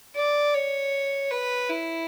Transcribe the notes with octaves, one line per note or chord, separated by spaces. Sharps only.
D5
C#5
B4
E4